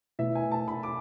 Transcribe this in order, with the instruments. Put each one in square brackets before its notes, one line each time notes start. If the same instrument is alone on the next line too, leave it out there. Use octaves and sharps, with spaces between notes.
[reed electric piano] B2 A3 E4 B4 [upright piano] E5
[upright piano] G#5
A5
B5
D6